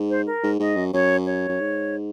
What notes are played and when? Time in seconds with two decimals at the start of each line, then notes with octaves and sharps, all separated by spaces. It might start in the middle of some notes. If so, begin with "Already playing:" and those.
Already playing: G#2
0.10 C5
0.27 A#4
0.43 G#2
0.60 G#2 D#5
0.76 F#2
0.93 F#2 C#5
1.26 C#5
1.49 F#2
1.60 G#2